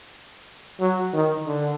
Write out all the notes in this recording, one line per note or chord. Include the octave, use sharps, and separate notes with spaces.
F#3
D#3
D3